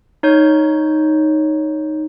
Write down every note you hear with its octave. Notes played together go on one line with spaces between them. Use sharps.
D#4 C#5 G6